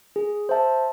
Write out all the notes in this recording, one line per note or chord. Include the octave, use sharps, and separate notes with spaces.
G#4
C5 E5 A5